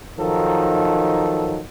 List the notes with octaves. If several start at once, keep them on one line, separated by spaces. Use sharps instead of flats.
D#3 F3 F#3 D#4 A4